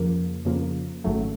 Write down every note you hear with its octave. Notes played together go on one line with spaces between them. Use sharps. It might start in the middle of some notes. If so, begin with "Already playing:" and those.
Already playing: F2 C#3 F3 A#3
F2 C#3 F3 A#3
G#1 F#2 C#3 F#3 A3